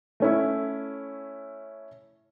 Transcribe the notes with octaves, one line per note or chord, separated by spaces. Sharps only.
A3 C#4 E4